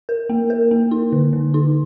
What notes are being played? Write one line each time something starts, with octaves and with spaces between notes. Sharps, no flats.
A#4
A#3
A#4
A#3
D#4
D3
D3
D#4